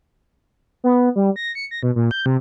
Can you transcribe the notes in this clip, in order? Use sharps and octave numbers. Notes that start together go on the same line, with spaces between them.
B3
G3
A#6
C#7
A#6
B2
A#2
G6
C3